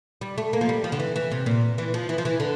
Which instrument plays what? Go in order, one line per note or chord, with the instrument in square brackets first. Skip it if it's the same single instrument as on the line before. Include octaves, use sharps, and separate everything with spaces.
[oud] G3
A3
A#3
F3
G3
F3
D3
E3
E3
C3
A#2
E3
F3
E3
F3
E3
D3